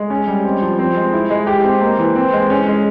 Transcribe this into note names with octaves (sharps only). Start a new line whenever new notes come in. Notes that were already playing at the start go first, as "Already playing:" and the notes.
Already playing: G#3
C#4
G3
C4
F3
C4
G#3
E4
G#3
G4
C4
A#3
E3
C4
G#3
C#4
G#3